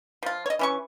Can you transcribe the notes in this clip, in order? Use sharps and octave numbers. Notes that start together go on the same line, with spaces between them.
F3 F4
C#5 D#5
E3 C#4 C#6